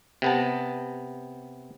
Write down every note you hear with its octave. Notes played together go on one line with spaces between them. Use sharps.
C3 B3 A5